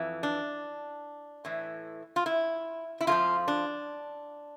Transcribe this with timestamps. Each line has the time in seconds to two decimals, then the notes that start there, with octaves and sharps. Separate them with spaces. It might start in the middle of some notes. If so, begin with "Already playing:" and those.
Already playing: F2 E3
0.23 D4
1.45 A2 E3
2.16 F4
2.26 E4
3.01 E4
3.07 F2 D3 F3 F4
3.48 D4